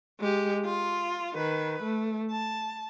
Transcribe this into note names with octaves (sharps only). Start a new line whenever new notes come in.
G#3 G4
F4
D#3 B4
A3
A5